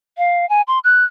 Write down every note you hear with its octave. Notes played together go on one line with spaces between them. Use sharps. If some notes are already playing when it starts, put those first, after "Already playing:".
F5
G#5
C6
F#6